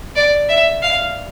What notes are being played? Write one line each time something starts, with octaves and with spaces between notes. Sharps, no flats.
D5
E5
F5